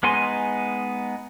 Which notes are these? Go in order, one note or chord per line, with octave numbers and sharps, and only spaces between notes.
G#3 B3 D#4 G#5 C6